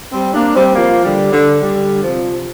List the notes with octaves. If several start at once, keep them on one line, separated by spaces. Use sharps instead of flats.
G3 C4
A#3 D4
G3 C4
F3 A#3
D3 G3
D3
D3 G3
C3 F3